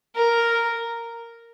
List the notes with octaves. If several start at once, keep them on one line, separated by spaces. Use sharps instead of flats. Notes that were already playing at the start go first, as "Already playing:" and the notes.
A#4